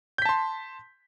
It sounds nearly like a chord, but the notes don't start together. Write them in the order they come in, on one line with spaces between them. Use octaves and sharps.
G6 B6 A5 C6